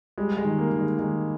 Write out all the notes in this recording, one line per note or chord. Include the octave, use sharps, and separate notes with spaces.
G3 G#3
G#3
D#3
A#3
D#3
G#3
D#3 G#3